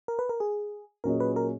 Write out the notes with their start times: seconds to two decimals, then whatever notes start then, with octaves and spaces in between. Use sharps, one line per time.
0.08 A#4
0.19 B4
0.29 A#4
0.40 G#4
1.04 A#2 F#3 C#4 G#4 A#4 D#5
1.20 B4
1.36 A#4